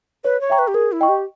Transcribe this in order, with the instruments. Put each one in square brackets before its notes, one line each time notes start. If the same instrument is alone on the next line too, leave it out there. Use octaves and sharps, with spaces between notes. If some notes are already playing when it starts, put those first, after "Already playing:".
[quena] B4 [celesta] C#5
[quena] C#5
[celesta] E5 G5 A#5 C#6
[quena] B4
G4
[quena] G#4 [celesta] A#4
[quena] E4
[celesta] D#5 G5 C#6
[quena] G4